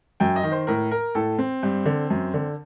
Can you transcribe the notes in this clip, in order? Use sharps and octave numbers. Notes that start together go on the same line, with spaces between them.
F#2 G5
D#5
D#3
C5
A2 A#4
A#4
A2 A4
C4
G2
D3
F#2
D3